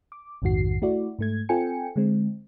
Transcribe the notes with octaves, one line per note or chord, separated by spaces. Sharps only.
D6
A#1 F2 G#2 D#3 F#4 C7
A3 E4 F#4 D5
G#2 A3 G#6
C4 F4 A4 G5 G#5 C#7
D3 G#3 C4